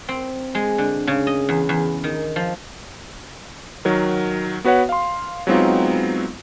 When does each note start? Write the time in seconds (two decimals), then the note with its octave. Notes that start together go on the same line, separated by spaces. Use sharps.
0.09 C4
0.55 G#3
0.78 D3
1.07 C#3
1.27 D#5
1.49 E2
1.69 E2
2.04 D#3
2.36 F3
3.85 D#3 F#3 A#4
4.64 B3 F#4 B4 C#5 F#5
4.89 F5 C6
5.47 F#3 G#3 B3 C4 D#4 F4